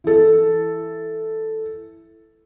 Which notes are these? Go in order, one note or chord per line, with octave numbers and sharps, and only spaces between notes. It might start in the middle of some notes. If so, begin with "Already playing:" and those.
E3 A4